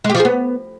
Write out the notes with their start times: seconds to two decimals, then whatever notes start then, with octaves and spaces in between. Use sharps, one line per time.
0.04 G#3
0.10 G4
0.15 F3
0.20 G#4
0.25 B3